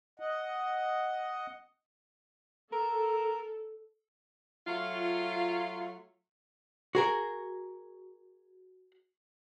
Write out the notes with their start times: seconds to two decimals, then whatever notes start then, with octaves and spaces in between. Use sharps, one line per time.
0.20 D#5 F#5
2.72 A4 A#4
4.67 F#3 A3 F4
6.95 F#4 G#4 A#4